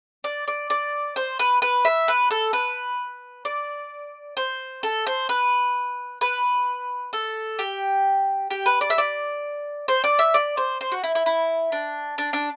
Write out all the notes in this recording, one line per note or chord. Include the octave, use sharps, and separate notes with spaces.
D5
D5
D5
C5
B4
B4
E5
B4
A4
B4
D5
C5
A4
C5
B4
B4
A4
G4
G4
B4
D5
E5
D5
C5
D5
E5
D5
C5
C5
F#4
E4
E4
E4
D4
D4
D4